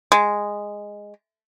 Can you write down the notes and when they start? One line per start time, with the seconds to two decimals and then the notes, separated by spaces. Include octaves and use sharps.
0.12 G#3